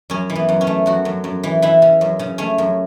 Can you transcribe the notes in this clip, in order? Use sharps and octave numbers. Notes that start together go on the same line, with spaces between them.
F#2 C#4
E3
B3
F#2
C#4
A3
F#2 F#4
F#2
F#2
E3
E3 E4
C#3
F#2
C#3
A3 C#4
F#2